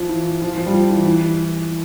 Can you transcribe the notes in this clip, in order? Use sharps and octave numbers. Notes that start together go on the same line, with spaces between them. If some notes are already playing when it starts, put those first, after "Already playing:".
Already playing: F3
E3
F3
F3
G3
F3
E3
E3